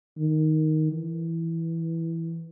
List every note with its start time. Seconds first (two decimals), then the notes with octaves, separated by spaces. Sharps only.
0.18 D#3
0.92 E3